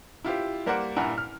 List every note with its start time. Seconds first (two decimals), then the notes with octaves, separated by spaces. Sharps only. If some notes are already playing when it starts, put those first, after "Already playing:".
0.24 E4 F4 G4 C5
0.66 G3 A#3 A#4 C5 D5 F#5
0.96 G2 A#2 E4 F#5 G#5 A#5
1.18 F6